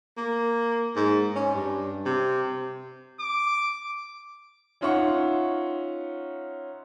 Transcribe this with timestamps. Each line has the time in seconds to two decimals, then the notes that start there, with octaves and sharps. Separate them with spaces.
0.17 A#3
0.96 G#2
1.36 C#4
1.55 G2
2.06 C3
3.20 D6
4.81 C#4 D#4 F4 E5 F#5 C#6